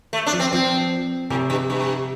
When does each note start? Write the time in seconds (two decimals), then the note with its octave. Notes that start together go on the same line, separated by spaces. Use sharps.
0.13 A3
0.26 D4
0.33 F3
0.40 C4
0.53 F3 C4
1.30 A2 C3
1.50 G2
1.70 G2